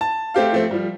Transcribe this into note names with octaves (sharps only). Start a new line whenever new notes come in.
A5
A3 C4 G4 F5
F3 A3 C4
F3 G3